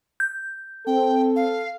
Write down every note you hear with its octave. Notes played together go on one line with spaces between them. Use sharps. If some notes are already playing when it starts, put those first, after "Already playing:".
G6
C4 A4 G5
F5